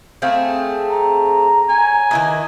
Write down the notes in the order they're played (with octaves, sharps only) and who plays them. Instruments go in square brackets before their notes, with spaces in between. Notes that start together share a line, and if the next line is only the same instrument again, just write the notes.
[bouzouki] A3 C4 G#4 [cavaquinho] F5 G5 B5
[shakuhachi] A#5
[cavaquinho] C#5 [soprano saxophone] G#5
[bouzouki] D#3 E4 D#5 [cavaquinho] B4 E5 D6